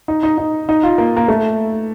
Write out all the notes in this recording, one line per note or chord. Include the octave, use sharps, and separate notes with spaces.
D#4
D#4
D#4
D#4
F4
A#3
A#3
A3